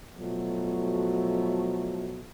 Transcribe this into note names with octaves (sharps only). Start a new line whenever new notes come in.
B2 F3 F#3 A3